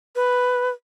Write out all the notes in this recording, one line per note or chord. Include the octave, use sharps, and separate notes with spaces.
B4